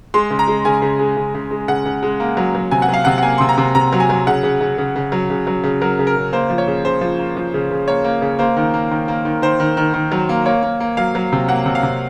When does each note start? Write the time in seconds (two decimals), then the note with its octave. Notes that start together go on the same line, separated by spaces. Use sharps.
0.14 G#3 C6
0.30 C#3
0.39 A#5
0.48 G#3
0.65 C#3 G#5
0.82 C#3
0.99 G#3
1.17 C#3
1.34 C#3
1.51 G#3
1.68 C#3 F#5
1.85 C#3
2.03 G#3
2.20 A#3
2.37 F#3
2.55 F#3
2.71 C3 G#5
2.82 F#5
2.88 F#3
2.94 F5
3.05 C3 F#5
3.18 F#5
3.23 A#3 G#5
3.38 C3 C6
3.49 A#5
3.58 C3
3.75 C3 A#5
3.93 F#3
4.00 G#5
4.10 F#3
4.27 C#3 F#5
4.43 C#3
4.61 C#3
4.78 C#3
4.96 C#3
5.12 F#3
5.30 C#3
5.47 F#3
5.63 C#3
5.81 F#3 A#4
5.99 C#3
6.07 A#4
6.16 C#3
6.33 A#3 C5
6.50 F3
6.58 C#5
6.67 C#3
6.85 C#3 C5
7.01 F3
7.19 A#3
7.36 F3
7.54 C#3
7.71 C#3
7.88 A#3 C#5
8.04 A#3
8.22 C#3
8.39 A#3 C5
8.57 D#3
8.74 A#3
8.91 D#3
9.08 A#3
9.25 D#3
9.42 D#3 C5
9.60 D#3
9.77 D#3
9.94 D#3
10.12 F#3
10.29 A#3
10.46 A#3 C#5
10.63 A#3
10.80 A#3
10.97 F#3 F5
11.15 F#3
11.32 C3
11.48 A#3 F#5
11.66 C3
11.75 F5
11.83 C3